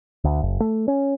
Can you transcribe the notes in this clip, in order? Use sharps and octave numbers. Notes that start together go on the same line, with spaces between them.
D2
F#1
A3
C#4